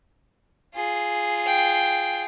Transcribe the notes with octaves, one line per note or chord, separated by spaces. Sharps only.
F4 G#4
G5